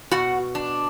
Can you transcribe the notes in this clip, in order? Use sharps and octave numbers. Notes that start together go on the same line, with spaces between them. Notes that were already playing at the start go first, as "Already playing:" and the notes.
B2 F#4 F#5
D4